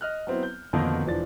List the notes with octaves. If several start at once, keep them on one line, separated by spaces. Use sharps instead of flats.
D#5 F6 F#6
F#3 B3 C4 E4
G6
F2 B2 D3 D#3 A#3 D#4
E1 E3 F3 D4 A6